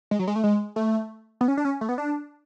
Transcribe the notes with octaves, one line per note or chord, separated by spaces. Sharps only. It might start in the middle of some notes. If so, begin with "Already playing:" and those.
G#3
F#3
G#3
A3
G#3
A3
B3
C#4
D4
C#4
A3
B3
D4